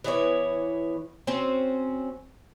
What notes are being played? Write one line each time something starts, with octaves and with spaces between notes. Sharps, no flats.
E3 B3 E4 C#5
C4 C#4 F#4